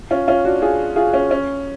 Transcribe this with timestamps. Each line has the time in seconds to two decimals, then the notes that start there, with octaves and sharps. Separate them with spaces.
0.11 C#4 F4
0.28 C#4 F4
0.45 D4 F#4
0.62 F4 G#4
0.96 F4 G#4
1.14 C#4
1.31 C#4